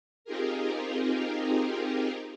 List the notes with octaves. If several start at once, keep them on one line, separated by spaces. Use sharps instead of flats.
C4 D#4 F4 G4 G#4 A#4